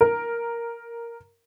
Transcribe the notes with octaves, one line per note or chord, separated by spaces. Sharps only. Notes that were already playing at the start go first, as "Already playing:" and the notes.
A#4